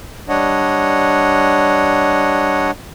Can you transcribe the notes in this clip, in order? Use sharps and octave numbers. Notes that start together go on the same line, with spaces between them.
G3 D4 C#5 D#5 F#5